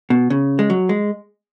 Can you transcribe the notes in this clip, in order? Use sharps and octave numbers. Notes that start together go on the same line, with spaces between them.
B2
C#3
G#3
F#3
G#3